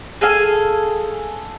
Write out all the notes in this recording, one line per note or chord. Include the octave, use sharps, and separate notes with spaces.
G#4 A4 F5 G#5